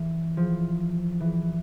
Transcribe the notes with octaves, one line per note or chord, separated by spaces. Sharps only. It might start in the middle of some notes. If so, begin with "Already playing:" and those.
Already playing: E3
F3
E3